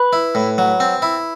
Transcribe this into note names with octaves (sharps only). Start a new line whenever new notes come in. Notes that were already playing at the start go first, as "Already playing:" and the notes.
Already playing: B4
E4
A2
F#3
C4
E4